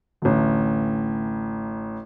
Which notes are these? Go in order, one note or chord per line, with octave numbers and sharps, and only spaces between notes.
A1 D2